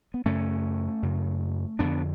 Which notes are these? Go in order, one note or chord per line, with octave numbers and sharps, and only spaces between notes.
B3
F#2 C#3 A3 C#4
F#2 C#3
F2 D3 B3 D4